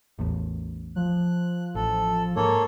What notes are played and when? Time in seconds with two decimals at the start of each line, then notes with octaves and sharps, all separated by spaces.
0.18 A1 E2 A2
0.96 F3 F#6
1.75 A1 A4
2.36 G#2 A#3 A4 C#5